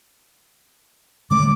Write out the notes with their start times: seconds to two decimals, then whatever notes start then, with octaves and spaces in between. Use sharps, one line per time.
1.31 D3 G#3 A3 D6